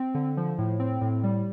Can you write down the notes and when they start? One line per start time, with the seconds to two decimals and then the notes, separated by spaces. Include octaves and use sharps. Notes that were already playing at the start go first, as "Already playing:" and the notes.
Already playing: C4
0.14 D3
0.37 F3
0.58 A2
0.80 C4
1.01 A2
1.23 G3